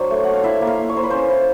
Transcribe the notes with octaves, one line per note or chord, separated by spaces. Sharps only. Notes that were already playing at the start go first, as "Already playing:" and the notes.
Already playing: F#3 D4 C5 D5
A3
D4 F#5
F5
E4 E5
A#3
F5
A#3
C#5
A#3 C5
B4
C#4 C5
E4